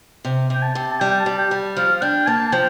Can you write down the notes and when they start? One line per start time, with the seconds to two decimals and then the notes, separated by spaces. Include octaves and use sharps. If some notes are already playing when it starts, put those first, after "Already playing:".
0.25 C3
0.50 C3 G5
0.63 A5
0.75 C3
0.92 A5
1.00 G3 G5
1.11 G5
1.20 A5
1.26 G3
1.38 G5
1.51 G3
1.76 F3 F5
1.95 F5
2.02 D4 G5
2.27 A#3 A5
2.48 A5
2.52 F3 G5